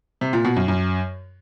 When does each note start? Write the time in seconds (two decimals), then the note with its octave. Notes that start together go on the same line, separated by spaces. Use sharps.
0.21 C3
0.33 A#2
0.45 B2
0.56 F#2
0.68 F#2